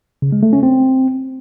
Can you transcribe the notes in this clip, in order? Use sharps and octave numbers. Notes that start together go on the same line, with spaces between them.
C#3
G#3
A3
C#4
C4